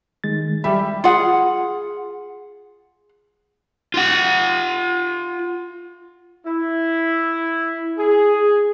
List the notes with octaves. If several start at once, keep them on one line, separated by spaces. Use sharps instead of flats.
D#3 G#3 A6
G3 G4 E5 B5
F4 G#4 F#5
F4 F#5
E4
G#4